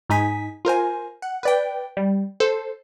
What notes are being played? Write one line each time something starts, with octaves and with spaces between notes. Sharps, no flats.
G#2 D#4 G#5 B6
F4 A#4 C5 G#5
F#5
B4 D5 G5
G3
A4 C5